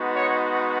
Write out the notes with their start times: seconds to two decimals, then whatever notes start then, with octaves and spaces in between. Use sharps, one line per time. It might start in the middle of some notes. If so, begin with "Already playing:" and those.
Already playing: G#3 B3 D#4 F#4
0.14 C#5